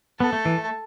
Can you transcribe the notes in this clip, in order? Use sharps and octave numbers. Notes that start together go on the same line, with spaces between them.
B3 A4
A3
E3
A3